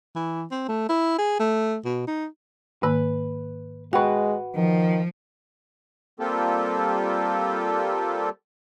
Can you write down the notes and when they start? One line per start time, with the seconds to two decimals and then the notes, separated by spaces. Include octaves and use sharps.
0.15 E3
0.51 C4
0.68 A3
0.89 E4
1.18 G#4
1.40 A3
1.85 B2
2.07 D#4
2.83 G#2 D#3 A#3 B4
3.93 G#3 F#4 B4 G5 C#6
4.55 D#3 F3
6.20 G3 A#3 C4 F4 G4 A4